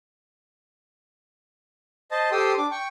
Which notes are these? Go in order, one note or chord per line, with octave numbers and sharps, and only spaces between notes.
C5 D#5 A5
G4 A4 C5 G5 C6 D#6
D4 D6
G5 C#6